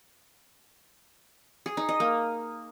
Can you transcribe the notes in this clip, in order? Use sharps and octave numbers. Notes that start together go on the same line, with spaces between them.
G#4
D#4
D#5
A#3